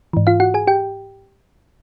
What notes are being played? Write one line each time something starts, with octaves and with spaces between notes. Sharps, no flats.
G#2 E3
F4 F5
F#4 F#5
G#4 G#5
G4 G5